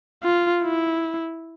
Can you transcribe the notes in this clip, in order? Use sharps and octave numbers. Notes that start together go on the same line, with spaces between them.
F4
E4